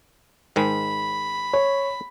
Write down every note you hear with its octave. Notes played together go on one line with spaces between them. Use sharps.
G#2 D#3 G#3 B5
C#5